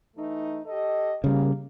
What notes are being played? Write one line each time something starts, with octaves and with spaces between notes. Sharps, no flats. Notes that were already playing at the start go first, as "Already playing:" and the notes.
E3 A3 D#4
G4 A4 D#5
C#3 G3 A#3